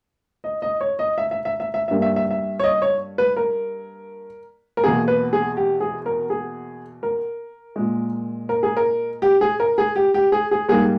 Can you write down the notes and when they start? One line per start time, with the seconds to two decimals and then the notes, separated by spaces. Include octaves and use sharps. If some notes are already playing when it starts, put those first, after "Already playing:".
0.44 D#5
0.62 D#5
0.81 C#5
0.99 D#5
1.18 E5
1.31 E5
1.45 E5
1.60 E5
1.74 E5
1.88 G2 G3 A#3 E5
2.02 E5
2.16 E5
2.31 E5
2.59 C#5
2.64 D#5
2.82 C#5
3.18 B4
3.37 A#4
4.77 A#4
4.84 E2 B2 A#3 G#4
5.08 B4
5.33 G#4
5.57 G4
5.80 G#4
6.06 A#4
6.30 G#4
7.03 A#4
7.76 A#2 G#3
8.49 A#4
8.63 G#4
8.77 A#4
9.22 G4
9.41 G#4
9.60 A#4
9.78 G#4
9.96 G4
10.14 G4
10.32 G#4
10.51 G#4
10.68 G#2 G3 A#3 G#4